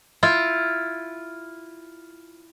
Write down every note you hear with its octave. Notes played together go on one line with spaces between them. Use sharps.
E4 F4